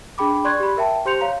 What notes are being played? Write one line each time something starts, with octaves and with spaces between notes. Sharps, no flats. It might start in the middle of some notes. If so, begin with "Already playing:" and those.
D4 G#4 G5 B5 D6
D5 C6 C#6 F#6 G#6
G4 B5
A#4 E5 G5 A5
G4 C5 C6 G6 C#7 F7
C#5 F5 A#5